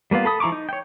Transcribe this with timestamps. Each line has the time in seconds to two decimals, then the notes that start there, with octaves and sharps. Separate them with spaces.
0.11 G3 A#3 B3 F4
0.25 A4 B5 D#6
0.40 F3 E4 A#5 C#6 D6
0.52 D#4
0.69 C#5 G5